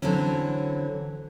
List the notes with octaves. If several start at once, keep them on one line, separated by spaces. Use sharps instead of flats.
D3 E3 F#3 C4 C#4